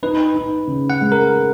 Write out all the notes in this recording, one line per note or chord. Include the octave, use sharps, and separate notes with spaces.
D#4 B4
D#4
C#3
F#5
G#3
A#4